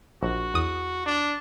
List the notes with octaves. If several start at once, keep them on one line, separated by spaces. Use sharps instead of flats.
A#1 F#4
E2 D#6
D4